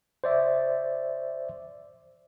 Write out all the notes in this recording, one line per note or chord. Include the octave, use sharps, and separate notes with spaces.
C5 D5 E5